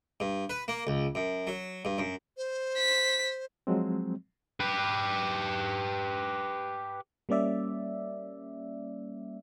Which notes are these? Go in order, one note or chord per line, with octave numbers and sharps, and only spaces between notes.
G2
B4
A#3
C#2
F#2
F#3
G2
F#2
C5
B6
F3 F#3 G#3 C4
G4 B4
G3 A#3 C#4 D5 E5